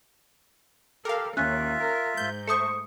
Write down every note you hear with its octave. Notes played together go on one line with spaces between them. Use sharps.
G4 A4 A#4 F5
D#2 C#4 F4 E5 F#6
A#4
G#2 G6
A3 C5 C#6 D#6 C#7